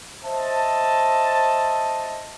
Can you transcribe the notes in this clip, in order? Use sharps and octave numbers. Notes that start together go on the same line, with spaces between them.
C5 D#5 E5 A5